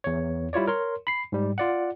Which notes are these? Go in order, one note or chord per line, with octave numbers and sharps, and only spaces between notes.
E2 C#5
G3 E4 F4 C#5 D5
A#4 C#5 C6
B5 C7
G#2 G3
F4 D5 F#5